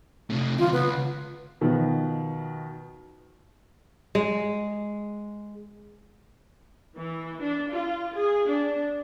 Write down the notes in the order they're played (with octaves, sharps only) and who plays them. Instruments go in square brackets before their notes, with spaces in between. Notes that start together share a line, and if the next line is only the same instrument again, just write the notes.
[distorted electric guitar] C3 A3
[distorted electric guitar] D#3 F#3 [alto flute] F4
[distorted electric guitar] C#2 [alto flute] B3
[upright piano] B2 D#3 F3 B3
[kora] G#3
[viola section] E3
D4
F4
G#4
D4